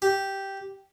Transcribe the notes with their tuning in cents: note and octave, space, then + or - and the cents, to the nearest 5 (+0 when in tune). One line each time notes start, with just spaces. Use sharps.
G4 -5